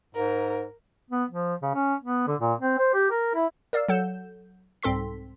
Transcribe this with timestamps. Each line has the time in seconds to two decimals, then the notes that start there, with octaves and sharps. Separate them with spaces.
0.15 G#2 A#4
1.10 B3
1.30 F3
1.62 C#3
1.74 C#4
2.03 B3
2.27 D3
2.40 A#2
2.60 C4
2.78 C5
2.93 G4
3.10 A#4
3.35 E4
3.73 A#4 D5 F5 E6
3.89 F#3 A4 F#5 G6 E7
4.83 C2 G#2 C4 A4 C6 B6